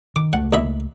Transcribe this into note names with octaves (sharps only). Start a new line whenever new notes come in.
D#3 D6
C#2 A3 F#5
D#2 E4 E5